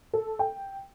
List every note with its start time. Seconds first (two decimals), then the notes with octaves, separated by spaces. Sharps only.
0.13 A4
0.39 G5